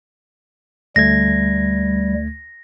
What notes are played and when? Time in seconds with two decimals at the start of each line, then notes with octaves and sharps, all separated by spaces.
0.96 D2 G3 A3 G#6 A#6